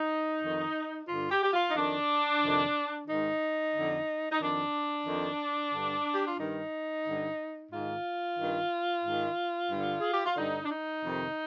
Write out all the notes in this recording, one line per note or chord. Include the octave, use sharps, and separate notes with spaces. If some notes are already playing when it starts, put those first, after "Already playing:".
Already playing: D#4
F2 D#3
G2 D3 F4
G4
G4
F4
D#4
F2 D#3 D4
F2 C3 D#3
G#2 D#3 D#4
D3
F2
D#4
F2 D#3 D4
F2 D#3
G2 D3
G4
F4
G2 D#3 D#4
G2 D3
G#2 D#3 F4
G2 D#3
G#2 D#3
G2 D3
G#4
G4
F4
G2 D3 D#4
D4
D#4
F2 C3 D#3